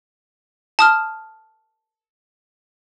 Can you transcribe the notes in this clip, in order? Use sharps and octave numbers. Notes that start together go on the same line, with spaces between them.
A5 D#6 F6